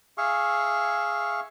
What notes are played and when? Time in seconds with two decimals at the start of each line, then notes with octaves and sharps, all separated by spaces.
0.18 G#4 E5 F5 C#6